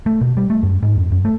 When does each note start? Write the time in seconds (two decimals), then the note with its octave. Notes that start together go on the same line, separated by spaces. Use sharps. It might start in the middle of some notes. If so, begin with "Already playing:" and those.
0.06 A3
0.21 B2
0.37 G3
0.50 A3
0.63 F#2
0.83 G#2
0.96 F2
1.12 F#2
1.25 A3